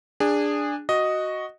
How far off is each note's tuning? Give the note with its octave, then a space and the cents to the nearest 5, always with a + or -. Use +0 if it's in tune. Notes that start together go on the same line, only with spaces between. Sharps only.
D4 +0 G#4 -20
F#4 +0 D#5 +0